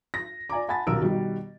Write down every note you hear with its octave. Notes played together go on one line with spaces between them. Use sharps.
A#6
D5 G#5 A#5 D6
F#5 G#5 A5 B5 A6
D#1 B1 F#4 A#4 E6 D7
B2 D#3 G3